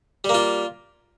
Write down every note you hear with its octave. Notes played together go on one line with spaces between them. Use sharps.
G3 A#3 F4